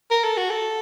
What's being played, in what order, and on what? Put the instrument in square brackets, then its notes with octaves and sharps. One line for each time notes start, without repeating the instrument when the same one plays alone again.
[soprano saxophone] A#4
A4
F#4
A4